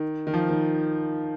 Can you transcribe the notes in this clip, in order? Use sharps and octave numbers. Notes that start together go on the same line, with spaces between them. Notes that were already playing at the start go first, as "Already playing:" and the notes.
Already playing: D#3
D#3
F3
D#3